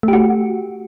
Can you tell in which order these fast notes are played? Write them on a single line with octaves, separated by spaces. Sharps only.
A3 G4 F#4